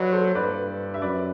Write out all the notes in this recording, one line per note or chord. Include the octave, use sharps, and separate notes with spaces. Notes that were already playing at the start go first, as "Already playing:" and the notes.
Already playing: F#3 B4 D5 E5
A4 C5
G2 B4 D5
E5
F#2 B4 D5